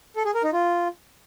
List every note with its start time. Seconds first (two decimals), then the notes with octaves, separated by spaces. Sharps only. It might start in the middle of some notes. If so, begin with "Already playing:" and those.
0.16 A4
0.25 G#4
0.34 A#4
0.43 D#4
0.53 F4